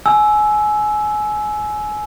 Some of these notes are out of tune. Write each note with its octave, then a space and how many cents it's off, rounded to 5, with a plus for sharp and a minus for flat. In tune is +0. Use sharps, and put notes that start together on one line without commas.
G#5 +25 E6 +0